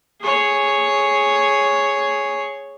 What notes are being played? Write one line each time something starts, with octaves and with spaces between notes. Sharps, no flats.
G#4 C#5